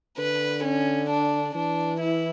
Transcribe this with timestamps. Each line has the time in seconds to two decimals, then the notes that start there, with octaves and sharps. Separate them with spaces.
0.18 D3 B4
0.64 C#4
1.10 D4
1.55 E3 D4
2.00 E4